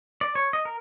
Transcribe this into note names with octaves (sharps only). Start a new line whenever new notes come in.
D5
C#5
D#5
A#4